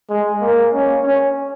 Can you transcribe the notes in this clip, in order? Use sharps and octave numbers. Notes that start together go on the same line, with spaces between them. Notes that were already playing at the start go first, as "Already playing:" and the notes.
G#3
A#3
C#4
C#4